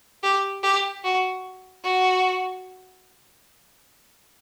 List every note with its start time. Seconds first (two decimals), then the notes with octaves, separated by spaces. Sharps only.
0.23 G4
0.63 G4
1.04 F#4
1.83 F#4